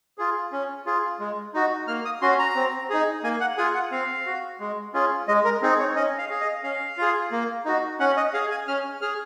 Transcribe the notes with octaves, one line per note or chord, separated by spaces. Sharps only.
F4 G#4
C#4
F4 G#4
G#3
D#4 F#4
A#3 F6
D#6
C#4 F#4 C6
A#5
C4
D#4 G#4
A#3 G#5
F#5
F4 G#4 G#5
F#5
C4 F5
F#4
G#3
C#4 F4 G#4
G#3 D#5
A#4
C4 D#4 G#4
C#5
C#4 D#5
F5
G#4 F5
D#5
C#4 F5
F4 G#4
A#3
D#4 F#4
C#4 F#5
D#5
G#4 F5
G#5
C#4 F6
G#4 F6